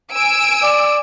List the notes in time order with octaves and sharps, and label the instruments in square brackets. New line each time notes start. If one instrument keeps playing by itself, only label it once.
[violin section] G#5 E6 D7
[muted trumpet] D5